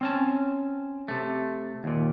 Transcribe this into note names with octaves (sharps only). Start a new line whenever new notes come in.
C4 C#4 A5
C3 A3
D#2 A#2